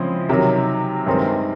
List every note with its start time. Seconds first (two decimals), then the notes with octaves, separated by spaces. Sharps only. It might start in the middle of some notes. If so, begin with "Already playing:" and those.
Already playing: C#3 F3 G#3 C4 E4
0.29 C3 D#3 F#3
1.07 G2 D#3 G#3 C4